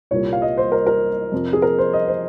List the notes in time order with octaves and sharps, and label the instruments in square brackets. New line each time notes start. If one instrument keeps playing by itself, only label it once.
[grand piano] C2 A#2 G3 A#3 C#5
F5
D#5
C5
A#4
A#4
F2 C3 F3
G#4
A#4
C5
D#5
C5